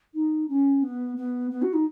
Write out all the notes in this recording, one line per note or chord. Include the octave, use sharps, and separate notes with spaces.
D#4
C#4
B3
B3
B3
F#4
D#4